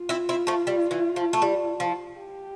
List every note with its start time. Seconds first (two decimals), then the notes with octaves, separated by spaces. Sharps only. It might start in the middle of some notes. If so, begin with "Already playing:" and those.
Already playing: F4
0.09 C4 E4
0.29 C4 E4
0.47 F3 A3
0.67 G3
0.91 E3
1.16 F3
1.33 A3
1.42 G3
1.80 F3
2.18 G4